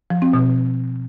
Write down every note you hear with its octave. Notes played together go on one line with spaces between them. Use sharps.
F3
C4
B2